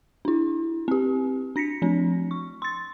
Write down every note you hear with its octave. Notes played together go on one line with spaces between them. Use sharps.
D4 E4
C4 G4
D4 A#6 B6 C#7
F3 C4 D4
C#6
C6 A6